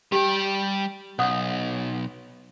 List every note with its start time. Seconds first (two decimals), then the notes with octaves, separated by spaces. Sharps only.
0.12 G3 G4 G5
1.19 B1 F#5 D#6